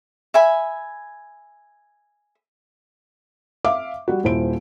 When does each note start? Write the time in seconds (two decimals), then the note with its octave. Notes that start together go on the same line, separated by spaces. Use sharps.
0.34 E5 G#5 B5
3.65 E5 F5 D6
4.08 G3 F#4
4.24 D#1 E4 C5 D7